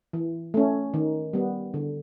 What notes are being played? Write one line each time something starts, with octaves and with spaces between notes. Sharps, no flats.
E3
A3 C#4
D#3
G3 B3
D3